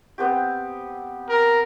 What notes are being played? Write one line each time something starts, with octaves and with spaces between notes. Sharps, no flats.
B3 C4 G4
A#4